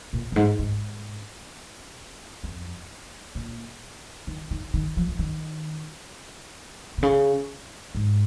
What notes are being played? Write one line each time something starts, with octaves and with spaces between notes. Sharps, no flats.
A#2
F2
G#2
G#2
F2
A#2
D#3
D#3
D#3
F3
F3
D#3
A#2
C#3
G#2